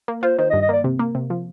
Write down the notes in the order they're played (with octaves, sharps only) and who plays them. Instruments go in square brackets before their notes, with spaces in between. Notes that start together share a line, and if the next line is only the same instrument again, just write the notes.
[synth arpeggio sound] A#3
[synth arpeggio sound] F4 [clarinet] C5
[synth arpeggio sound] D#3 [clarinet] C5
[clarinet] D#5
[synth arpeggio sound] G2
[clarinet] D#5
[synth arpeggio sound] A#3 [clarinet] D5
[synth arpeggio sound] C3
A#3
C3
F3